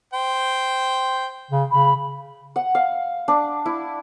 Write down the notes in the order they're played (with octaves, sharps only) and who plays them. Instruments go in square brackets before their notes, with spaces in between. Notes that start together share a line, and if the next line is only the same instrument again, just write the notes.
[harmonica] C5 G5
[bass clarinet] C#3
[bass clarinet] C#3 [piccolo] B5
[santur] F#5
F5
D4
E4